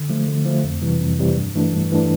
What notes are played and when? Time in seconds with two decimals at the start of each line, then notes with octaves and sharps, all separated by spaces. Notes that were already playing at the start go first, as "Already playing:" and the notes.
Already playing: D3
0.09 F3 A3
0.28 D3
0.46 F3 A3
0.64 F2
0.82 C3 E3 G3
1.00 F2
1.19 C3 E3 G3
1.36 G2
1.55 E3 A3 D4
1.73 G2
1.92 E3 A3 D4